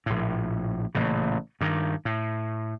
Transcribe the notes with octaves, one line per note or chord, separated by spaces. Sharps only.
A#1 A2
A1 A#2 C#3
G2 D#3
A2